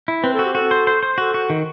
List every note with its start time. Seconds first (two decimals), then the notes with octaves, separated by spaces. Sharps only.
0.08 E4
0.23 C4 B4
0.34 A4
0.39 F#4
0.45 G4
0.55 F#4 A4
0.71 C5
0.87 C5
1.03 C5
1.18 F#4 A4
1.34 F#4
1.50 D#3